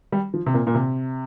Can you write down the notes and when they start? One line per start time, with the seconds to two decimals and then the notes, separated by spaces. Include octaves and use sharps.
0.12 G3
0.34 F3
0.46 C3
0.54 A#2
0.67 A#2
0.75 C3